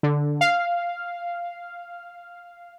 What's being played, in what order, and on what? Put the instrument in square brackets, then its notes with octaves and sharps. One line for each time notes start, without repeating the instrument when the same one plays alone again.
[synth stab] D3
F5